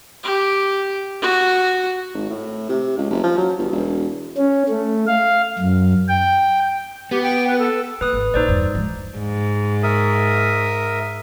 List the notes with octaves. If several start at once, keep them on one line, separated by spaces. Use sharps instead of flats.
G4
F#4
G#1
A2
C3
C#2
F#1
F3
F#3
G1
E1
C#4
A3
F5
F#2
G5
B3 G4
G5
B4
A4
A#2 B4 D#6 F#6
G#1
A#1 D#4 C5 D5
E2 G2
G#2 F3
G#2
A#4 E5 D#6